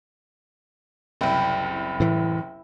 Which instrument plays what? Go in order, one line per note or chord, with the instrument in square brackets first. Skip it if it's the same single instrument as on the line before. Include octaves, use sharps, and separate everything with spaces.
[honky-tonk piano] F#1 C2 [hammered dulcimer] E4 G5
[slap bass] A2 E3